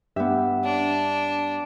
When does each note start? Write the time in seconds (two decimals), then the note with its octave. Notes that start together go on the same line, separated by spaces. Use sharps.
0.16 G2 B3 G4 E5
0.64 D4